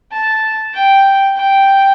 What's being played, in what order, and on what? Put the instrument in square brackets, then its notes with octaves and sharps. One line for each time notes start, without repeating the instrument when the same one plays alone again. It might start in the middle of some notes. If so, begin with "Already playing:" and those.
[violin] A5
G5
G5